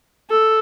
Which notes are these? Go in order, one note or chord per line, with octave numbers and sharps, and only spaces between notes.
A4